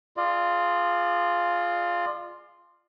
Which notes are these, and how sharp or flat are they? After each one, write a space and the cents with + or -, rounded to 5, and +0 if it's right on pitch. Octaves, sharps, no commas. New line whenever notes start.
F4 +0 G#4 +10 D5 +40